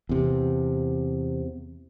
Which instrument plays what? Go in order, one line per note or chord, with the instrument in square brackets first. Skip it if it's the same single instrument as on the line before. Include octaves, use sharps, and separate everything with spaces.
[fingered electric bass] E2 C3